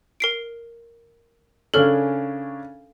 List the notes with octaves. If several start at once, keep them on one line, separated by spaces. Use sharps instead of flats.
A#4 C7 D7
C#3 C#4 D4 A4 A#4 F6